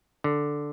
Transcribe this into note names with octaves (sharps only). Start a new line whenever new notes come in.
D3